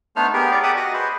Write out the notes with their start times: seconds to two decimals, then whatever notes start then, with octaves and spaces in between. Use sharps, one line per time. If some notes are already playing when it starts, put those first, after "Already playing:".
0.16 A3 B3 D4 D#4 C5 F6
0.33 B3 G4 G#4 A#4
0.51 C#5 D5
0.63 G4 E5 F#5 D6 D#6
0.77 F#4 D#5
0.94 G#4 B4 C5